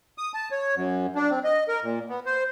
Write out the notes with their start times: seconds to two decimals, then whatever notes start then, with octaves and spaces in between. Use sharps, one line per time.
0.18 D#6
0.34 A5
0.51 C#5
0.75 F#2
1.15 D4
1.31 C4
1.44 D#5
1.68 A#4
1.83 A#2
2.09 B3
2.26 C5